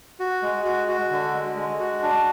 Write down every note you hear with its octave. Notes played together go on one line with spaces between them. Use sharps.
F#4
G#3
F#4
F#4
D3
G#3
G#3
F#4
D4